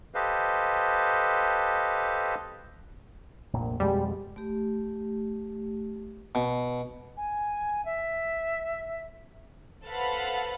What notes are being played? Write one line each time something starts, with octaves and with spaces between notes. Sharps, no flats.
G4 A4 B4 C5 D#5 F5
F1 A#1 A#2
F2 B2 G3 G#3
A3 G4
B2
G#5
E5
A4 B4 C5 F5 F#5 B5